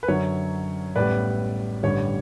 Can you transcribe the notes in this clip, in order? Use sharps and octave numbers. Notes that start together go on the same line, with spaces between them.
B4
F#2 D3 F#3 C#5
A1 A2 G3 B3 B4 D5
A1 G2 D3 G3 C#5